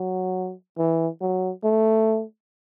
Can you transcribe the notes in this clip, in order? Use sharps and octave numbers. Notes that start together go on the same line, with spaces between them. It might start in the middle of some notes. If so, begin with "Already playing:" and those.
Already playing: F#3
E3
F#3
A3